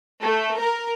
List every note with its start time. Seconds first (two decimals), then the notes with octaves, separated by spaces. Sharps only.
0.22 A3
0.59 A#4